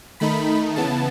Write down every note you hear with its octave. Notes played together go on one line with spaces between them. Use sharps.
D#3 A3 D#4 B5
C#3 E3 B3 A5